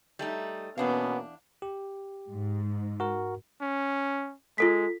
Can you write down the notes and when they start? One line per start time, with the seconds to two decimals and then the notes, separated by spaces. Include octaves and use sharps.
0.19 G3 A3 D#4
0.78 E2 B2 A#3 B3 C#4 D4 F5
1.62 G4
2.29 G#2
3.00 F#4 A#4
3.62 C#4
4.58 G#3 F4 A4 B6